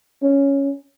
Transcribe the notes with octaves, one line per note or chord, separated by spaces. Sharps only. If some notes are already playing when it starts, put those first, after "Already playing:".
C#4